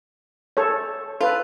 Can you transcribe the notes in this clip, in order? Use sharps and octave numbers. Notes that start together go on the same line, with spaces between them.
A4 C#5
F4 A4 B4